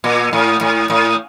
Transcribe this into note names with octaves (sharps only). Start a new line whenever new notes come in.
A#2
A2
A2
A2